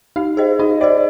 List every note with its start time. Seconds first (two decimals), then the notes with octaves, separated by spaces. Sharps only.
0.16 D#4 F5
0.37 G#4 C5 D#5
0.59 D#4 D#5
0.81 G#4 C5 D5 D#5